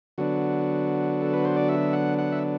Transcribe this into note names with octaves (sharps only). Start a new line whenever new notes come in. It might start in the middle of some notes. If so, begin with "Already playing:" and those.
D3 F#3 B3 D4 F#4
A4
B4
C5
D5
E5
F#5
F#5
E5